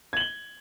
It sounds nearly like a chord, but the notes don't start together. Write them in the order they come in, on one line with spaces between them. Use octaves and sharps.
G#6 F#7 G7